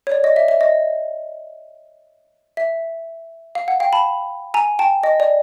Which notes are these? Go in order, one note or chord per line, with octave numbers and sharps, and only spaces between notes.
C#5
D5
D#5
E5
E5
D#5
E5
F5
F#5
F5 G5
A5 B5
G#5 A#5
G5 A5
D#5
D5